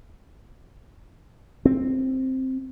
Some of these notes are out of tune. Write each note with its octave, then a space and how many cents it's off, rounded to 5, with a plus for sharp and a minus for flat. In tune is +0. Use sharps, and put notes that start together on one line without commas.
C4 +5